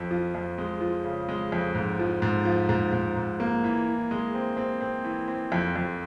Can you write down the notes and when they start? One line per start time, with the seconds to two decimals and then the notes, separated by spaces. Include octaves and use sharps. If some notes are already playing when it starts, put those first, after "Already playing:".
Already playing: F2
0.11 F3
0.35 F2
0.58 G#3
0.81 F3
1.04 C#3
1.29 G#3
1.52 F2
1.75 G#2
1.99 F3
2.22 G#2
2.45 F3
2.69 G#2
2.92 G#2
3.16 G#2
3.40 A#3
3.64 E3
3.86 E3
4.11 G#3
4.34 C4
4.57 C4
4.81 C4
5.05 E3
5.28 C4
5.52 F2
5.76 F2